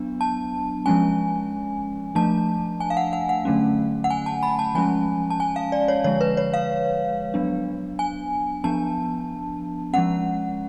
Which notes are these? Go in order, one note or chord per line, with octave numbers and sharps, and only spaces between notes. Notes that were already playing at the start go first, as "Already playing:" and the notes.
Already playing: F#3 B3 D4
A5
F3 G#3 C#4 G#5
F3 A3 D4 A5
G#5
F5
F#5
F#5
F#5
D3 F#3 A3 C#4
F#5
G#5
A5
B5
A5
F3 G#3 C#4 G#5
A5
G#5
F5
D5
C#5
D3 F3 G#3 C#5
B4
C#5
F5
F#3 B3 D4
G#5
F3 B3 D4 A5
F3 G#3 C#4 F#5